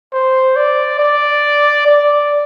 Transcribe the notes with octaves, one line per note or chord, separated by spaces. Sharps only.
C5
D5
D5
D5